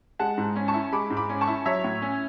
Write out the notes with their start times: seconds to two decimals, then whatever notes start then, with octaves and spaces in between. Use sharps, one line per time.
0.19 G#3 F#5 A5
0.38 G#2
0.56 C#4
0.68 A5 C#6
0.74 E4
0.92 G#3 B5 D6
1.10 G#2
1.17 B5 D6
1.29 C#4
1.41 A5 C#6
1.47 E4
1.66 F#3 C#5 E5
1.84 A2
2.02 C#4